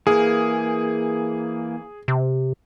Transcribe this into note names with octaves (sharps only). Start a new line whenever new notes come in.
E3 A#3 G#4
C3